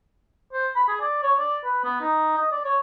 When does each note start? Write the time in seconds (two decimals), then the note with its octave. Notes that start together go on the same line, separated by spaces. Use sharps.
0.53 C5
0.75 B5
0.88 G#4
1.01 D5
1.22 C#5
1.38 D5
1.64 B4
1.84 B3
2.01 D#4
2.37 D#5
2.51 D5
2.64 C#5